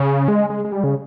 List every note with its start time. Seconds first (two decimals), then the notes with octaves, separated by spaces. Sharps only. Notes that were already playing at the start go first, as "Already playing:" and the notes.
Already playing: C#3
0.28 G#3
0.50 G#3
0.64 G#3
0.72 G3
0.84 C#3